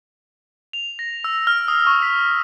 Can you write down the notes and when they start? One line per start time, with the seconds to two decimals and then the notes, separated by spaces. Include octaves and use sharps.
0.73 F7
0.99 A#6
1.24 E6
1.47 F6
1.68 D#6
1.87 C#6
2.02 B6